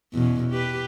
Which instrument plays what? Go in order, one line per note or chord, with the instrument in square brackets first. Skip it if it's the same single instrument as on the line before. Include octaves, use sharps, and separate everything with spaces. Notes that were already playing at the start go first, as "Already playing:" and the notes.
[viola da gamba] E2 B2 C#4
G4 B4